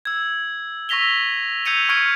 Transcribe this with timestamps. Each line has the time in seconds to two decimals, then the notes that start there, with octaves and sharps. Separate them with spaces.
0.05 E6 G#6
0.89 C#6 E6 A#6 B6 F7 G7
1.65 E6 G6 G#6 C#7 D#7 F7
1.89 C#6 F6 G#6 C#7 D7